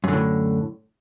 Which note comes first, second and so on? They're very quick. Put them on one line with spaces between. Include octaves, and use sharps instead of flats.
F#2 D3 A2